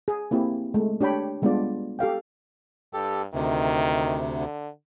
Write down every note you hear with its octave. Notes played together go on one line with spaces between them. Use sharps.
G#4
A#3 C4 E4 G4
G#3 A3
D4 G4 C#5 G5 B5
G3 G#3 B3 D4 F4 D5
G4 A4 F5 G5
G2 G4 A4
D2 C3 D#3
D3